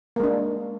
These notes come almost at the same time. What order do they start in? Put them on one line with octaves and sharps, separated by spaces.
A#3 G#3 D4